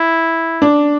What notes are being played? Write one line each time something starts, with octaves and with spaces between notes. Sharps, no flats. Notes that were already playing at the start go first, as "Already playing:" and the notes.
Already playing: E4
D4